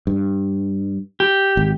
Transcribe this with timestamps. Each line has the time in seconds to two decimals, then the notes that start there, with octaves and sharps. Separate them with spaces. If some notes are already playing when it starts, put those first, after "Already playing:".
0.07 G2
1.20 G4
1.57 G#1